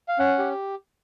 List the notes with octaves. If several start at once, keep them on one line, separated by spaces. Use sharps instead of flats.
F5
C#4 F#5
G4